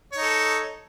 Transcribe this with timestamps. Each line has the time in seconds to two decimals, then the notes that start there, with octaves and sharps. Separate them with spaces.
0.12 C#5
0.17 D#4
0.22 A4